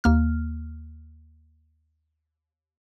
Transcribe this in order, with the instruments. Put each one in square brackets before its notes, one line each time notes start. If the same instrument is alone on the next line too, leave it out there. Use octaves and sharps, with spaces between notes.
[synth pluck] D#2 A#3 F6